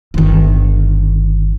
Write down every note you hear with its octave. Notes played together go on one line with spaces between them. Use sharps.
G1 D#3